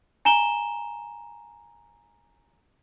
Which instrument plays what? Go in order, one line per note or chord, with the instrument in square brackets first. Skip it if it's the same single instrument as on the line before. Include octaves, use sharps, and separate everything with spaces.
[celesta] G#5 A#5 E7 G7